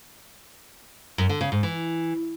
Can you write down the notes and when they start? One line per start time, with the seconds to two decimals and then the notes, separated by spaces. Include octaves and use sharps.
1.18 F#2
1.29 D3
1.41 C#3
1.52 G#2
1.63 E3